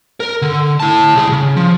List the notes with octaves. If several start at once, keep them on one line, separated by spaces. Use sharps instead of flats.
A#4
D3
E4 A5
C#2 G#4
C#3
F3